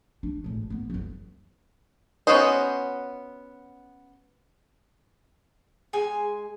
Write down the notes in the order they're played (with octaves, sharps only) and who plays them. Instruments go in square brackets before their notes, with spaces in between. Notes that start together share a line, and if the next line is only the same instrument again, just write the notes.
[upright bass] D4
G#1 A2
A#3 B3
F#1 F#2
[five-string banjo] B3 C#4 F#4 C5 D#5
[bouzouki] G#3 G#5